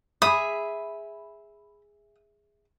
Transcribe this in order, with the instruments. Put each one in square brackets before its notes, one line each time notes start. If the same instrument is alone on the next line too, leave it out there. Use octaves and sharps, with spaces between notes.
[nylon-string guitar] G#4 E5 [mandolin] B5 [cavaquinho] D#6